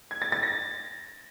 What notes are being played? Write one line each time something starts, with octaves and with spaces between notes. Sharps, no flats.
G#6
A6
A6
A#6